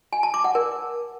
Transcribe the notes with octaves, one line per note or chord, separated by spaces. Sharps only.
G#5
A5
D6
F#5
A#4